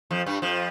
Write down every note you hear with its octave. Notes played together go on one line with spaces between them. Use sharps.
F2 F3
G2 G3
F2 F3